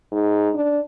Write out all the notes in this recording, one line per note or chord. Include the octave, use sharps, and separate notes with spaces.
G#2
D4